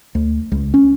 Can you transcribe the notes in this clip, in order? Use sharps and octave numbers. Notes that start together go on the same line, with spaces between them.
D2
C#2
C#4